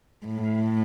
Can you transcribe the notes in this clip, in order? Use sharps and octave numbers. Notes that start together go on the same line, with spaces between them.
A2